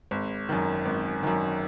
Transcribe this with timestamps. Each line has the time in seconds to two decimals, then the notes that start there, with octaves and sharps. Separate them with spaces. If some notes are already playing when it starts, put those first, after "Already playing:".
0.11 G#1
0.49 F#2 D#3
0.85 G#1
1.23 F#2 D#3